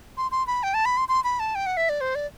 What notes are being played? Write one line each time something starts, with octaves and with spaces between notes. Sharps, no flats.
C6
C6
B5
G5
A5
B5
C6
C6
B5
A5
G5
F#5
E5
D5
C5
D5